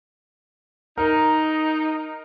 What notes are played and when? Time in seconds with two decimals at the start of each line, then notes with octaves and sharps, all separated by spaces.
0.98 D#4 A#4